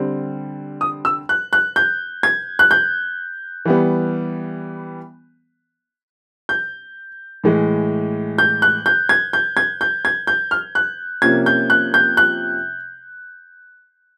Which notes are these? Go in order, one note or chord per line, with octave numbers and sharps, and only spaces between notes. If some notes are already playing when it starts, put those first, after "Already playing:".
Already playing: D3 G3 C4
D#6
E6
F#6
F#6
G6
G#6
F#6
G6
E3 G3 B3
G6
A2 E3 G#3
G6
F#6
G6
G#6
G6
G#6
G6
G#6
G6
F6
F#6
C3 F3 A#3 C#4 G#6
G6
F#6
G6
F#6